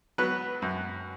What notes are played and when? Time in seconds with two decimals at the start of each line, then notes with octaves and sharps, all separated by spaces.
0.18 F#3 B3 B4
0.62 F#2